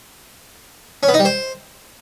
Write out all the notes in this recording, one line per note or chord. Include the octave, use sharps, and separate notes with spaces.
C#4
B3
D#4
G3
C5